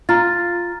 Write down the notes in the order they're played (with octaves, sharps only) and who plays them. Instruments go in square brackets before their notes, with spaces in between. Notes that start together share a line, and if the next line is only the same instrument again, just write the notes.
[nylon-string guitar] F4 [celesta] A#5 F6 A6